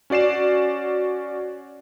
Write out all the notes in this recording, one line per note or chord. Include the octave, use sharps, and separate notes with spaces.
C#4 F#4 D5 C7 E7